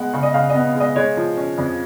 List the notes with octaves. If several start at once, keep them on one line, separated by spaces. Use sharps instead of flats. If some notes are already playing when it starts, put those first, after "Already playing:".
Already playing: G#3 B3 F#5
C#3
D#5
C#3 F5
D#5
B3
G#3 D#5
G#3 C#5
F3
C#4
F2